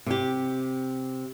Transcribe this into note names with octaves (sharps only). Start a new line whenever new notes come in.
C3 G4